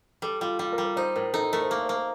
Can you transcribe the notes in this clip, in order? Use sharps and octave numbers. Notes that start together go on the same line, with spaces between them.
G3 A4
G3 F4
G3 F4
A#4
G3
A#4
D#4 C5
A2 A#4
D#4 A4
A4
A3 A#4
C5
A#3 A#4
C5
A#3
A#4